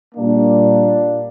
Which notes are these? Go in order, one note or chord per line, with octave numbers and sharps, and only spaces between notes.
A#2 G3 A#3 D4